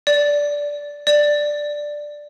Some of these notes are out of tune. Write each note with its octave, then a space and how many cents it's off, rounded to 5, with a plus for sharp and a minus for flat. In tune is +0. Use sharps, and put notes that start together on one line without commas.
D5 -10
D5 +5